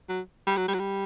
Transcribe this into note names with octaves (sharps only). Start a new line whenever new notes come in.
F#3
G3
F#3
G3
F#3
G3